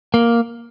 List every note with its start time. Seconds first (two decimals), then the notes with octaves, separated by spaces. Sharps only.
0.14 A#3